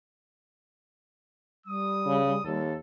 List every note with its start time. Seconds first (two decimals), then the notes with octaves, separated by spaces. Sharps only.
1.66 G3 D#6
2.06 C#3
2.45 D#2 A4